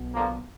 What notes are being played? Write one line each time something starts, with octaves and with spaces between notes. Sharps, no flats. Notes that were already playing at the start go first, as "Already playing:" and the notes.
Already playing: B1 B2
G2 D3 F3 A#3